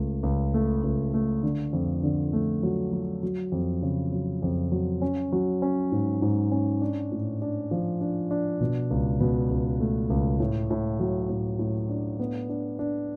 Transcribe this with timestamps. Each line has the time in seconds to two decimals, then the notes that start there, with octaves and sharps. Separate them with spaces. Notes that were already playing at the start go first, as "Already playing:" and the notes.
Already playing: C#2 A3
0.23 C#2
0.54 A3
0.83 C#2
1.14 A3
1.43 D3
1.73 F2
2.03 D3
2.33 A3
2.63 F#3
2.93 F#3
3.23 F#3
3.52 F2
3.82 C#3
4.12 F#3
4.42 F2
4.72 F#3
5.02 C#4
5.32 F#3
5.62 C#4
5.92 G#2
6.22 G#2
6.52 C#4
6.81 D4
7.12 A2
7.42 D4
7.71 F3
8.01 D4
8.31 D4
8.61 B2
8.91 C#2
9.20 B2
9.50 C#2
9.80 A3
10.10 C#2
10.40 A2
10.71 A2
11.00 F#3
11.30 A2
11.59 A2
11.90 D4
12.20 B3
12.49 D4
12.79 D4